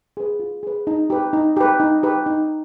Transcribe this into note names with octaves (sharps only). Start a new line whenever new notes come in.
G#4 B4
F4
G#4 B4
D#4
G4 B4
D#4
G4 B4
D#4
G4 B4
D#4